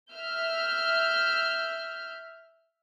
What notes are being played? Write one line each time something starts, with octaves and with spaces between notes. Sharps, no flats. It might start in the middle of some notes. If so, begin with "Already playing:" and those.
E5 F6 G6